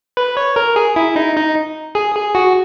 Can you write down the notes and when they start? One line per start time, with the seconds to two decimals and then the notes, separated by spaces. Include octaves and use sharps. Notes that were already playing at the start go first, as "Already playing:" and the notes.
0.17 B4
0.37 C#5
0.56 A#4
0.76 G#4
0.96 E4
1.16 D#4
1.36 D#4
1.95 G#4
2.15 G#4
2.35 F#4